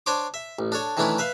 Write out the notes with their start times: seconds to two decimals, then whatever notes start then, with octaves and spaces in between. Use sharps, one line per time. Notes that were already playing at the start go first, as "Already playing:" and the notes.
0.06 D4 C5 C#5 C6 D6
0.34 E5
0.59 A1
0.72 D4 A4 C#5
0.97 D#3 E3 A3 C#4 D4 E4
1.18 B4 E5 F5